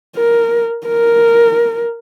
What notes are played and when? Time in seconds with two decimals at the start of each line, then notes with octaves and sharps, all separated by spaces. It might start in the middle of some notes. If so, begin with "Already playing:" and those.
0.16 A#4
0.87 A#4